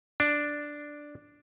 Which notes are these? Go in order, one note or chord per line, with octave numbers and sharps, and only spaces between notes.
D4